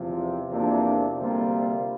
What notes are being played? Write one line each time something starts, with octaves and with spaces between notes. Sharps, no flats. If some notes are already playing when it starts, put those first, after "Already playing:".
Already playing: E2 C3 F3
E2 C3 F3 A#3 D4
D2 C3 G3 A#3 F4